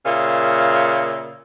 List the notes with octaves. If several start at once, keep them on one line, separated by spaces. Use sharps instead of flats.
A#2 C#3 E5 F5